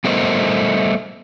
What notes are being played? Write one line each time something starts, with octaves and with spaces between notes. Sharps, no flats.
G3 A3 B3 A#4 C5 D#5